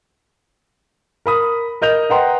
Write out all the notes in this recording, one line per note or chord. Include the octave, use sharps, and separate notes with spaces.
A#4 B5 D#6
A#4 D#5 G6 F7
B4 D#5 F#5 G5 A#5 C6